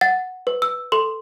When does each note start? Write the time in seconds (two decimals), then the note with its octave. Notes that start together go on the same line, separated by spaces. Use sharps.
0.01 F#5 A6
0.47 B4
0.62 E6
0.92 A4 C6